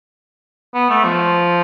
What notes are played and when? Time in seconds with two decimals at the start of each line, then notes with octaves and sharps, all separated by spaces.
0.74 B3
0.90 A3
1.04 F3